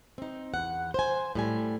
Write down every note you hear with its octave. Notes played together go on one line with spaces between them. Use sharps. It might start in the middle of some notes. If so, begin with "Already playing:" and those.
C4 D#4
E2 F#5
C5 G#5
A2 G3 G#5